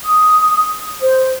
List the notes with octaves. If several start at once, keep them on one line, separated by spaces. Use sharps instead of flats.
D#6
C5